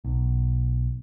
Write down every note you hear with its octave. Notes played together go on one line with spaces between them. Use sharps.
B1